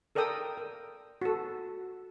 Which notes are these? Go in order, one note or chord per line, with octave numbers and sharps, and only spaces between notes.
A4 A#4 D5 G5 D#6 E6
A#4
F#4 A4